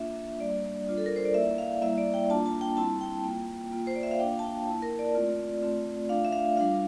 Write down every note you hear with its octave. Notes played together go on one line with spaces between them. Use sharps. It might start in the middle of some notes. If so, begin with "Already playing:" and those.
Already playing: A#3 D4 F4 E5
E5
G3 A#3 D4 D5
G3 D4 F4
A4
A#4
C5
D5
A#3 E4 E5
F5
G3 A#3 E4 E5
D5
G5
A#3 D4 F4 A5
A5
G5
G3 C4 E4 A5
G5
A#3 F4
A#3 F4
C5
D5
E5
F5
A#3 D4 F4 G5
A5
G5
A#3 E4 A5
A#4
D5
A3 C4 F4
A3 C4 F4
A3 D4 F4 F5
E5
F5
G3 D4 F4 F5